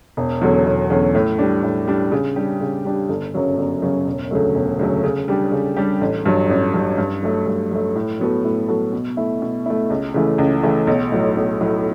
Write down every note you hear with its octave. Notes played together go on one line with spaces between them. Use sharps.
E1
E2 D3 F#3 C#4
E1
E2 D3 F#3 C#4
A2
G3 D4
A2
G3 D4
C#3
G3 D4 G4
C#3
G3 D4 G4
G1
F#2 C#3 F#3 C#4
G1
F#2 C#3 F#3 C#4
E1
D2 C#3 F#3 A3
E1
D2 C#3 F#3 A3
C#3
G3 D4 G4
C#3
G3 D4 G4
A1
G2 F#3
A1
G2 F#3
G2
F#3 A3
G2
F#3 A3
A2
F#3 B3 F#4 A4
A2
F#3 B3 F#4 A4
B2
A3 E4
B2
A3 E4
C#2
C#3 E3 A3
C#2
C#3 E3 A3
B1
A2 F#3
B1
A2 F#3